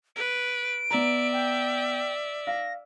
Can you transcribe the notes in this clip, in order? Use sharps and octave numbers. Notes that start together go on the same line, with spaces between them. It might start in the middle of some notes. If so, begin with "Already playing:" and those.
B4 D7
B3 D5 E5 A#5
G5
F5 A#6